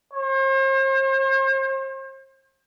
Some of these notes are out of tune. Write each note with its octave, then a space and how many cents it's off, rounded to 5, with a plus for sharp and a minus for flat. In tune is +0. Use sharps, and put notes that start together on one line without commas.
C5 +40